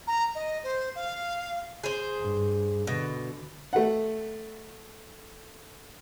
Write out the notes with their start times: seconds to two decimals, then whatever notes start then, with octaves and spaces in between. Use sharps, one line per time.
0.07 A#5
0.35 D#5
0.64 C5
0.95 F5
1.84 G#4 C5
2.18 G2
2.87 B2 D3
3.73 A3 F#5